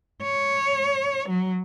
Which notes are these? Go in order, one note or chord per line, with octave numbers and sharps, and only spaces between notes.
C#5
F#3